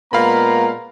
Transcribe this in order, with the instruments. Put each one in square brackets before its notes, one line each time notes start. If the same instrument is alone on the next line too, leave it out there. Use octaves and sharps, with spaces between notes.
[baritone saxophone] A#2 [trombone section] G#3 A#3 B3 [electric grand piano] F5 B5 [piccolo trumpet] A#5